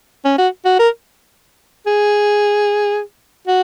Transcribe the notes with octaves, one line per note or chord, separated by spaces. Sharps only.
C#4
F#4
F#4
A#4
G#4
F#4